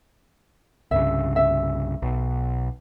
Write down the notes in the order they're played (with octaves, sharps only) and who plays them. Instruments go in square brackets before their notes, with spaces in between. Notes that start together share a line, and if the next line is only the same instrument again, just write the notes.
[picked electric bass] C2 G2 C#3 [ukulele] E5
[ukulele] E5
[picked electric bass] B1